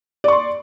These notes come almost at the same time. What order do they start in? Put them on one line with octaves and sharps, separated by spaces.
D5 C#6 C6